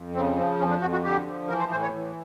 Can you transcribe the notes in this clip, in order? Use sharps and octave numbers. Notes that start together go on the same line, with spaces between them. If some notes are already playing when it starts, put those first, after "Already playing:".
Already playing: F2
C#3 C4
F3 C4
F2 C#4
D4
F2 F#4
F#4
D3 G4
F3
E3 A#4
C5
A2 C5
C#5
E3